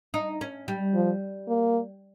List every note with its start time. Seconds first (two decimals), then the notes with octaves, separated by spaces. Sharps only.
0.14 D#4
0.41 C#4
0.68 G3
0.94 F3
1.48 A#3